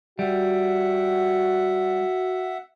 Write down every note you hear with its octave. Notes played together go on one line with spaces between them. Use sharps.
G3 F#4 E5 F#5